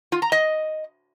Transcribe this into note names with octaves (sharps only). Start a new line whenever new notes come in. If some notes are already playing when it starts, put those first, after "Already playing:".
F4
A#5
D#5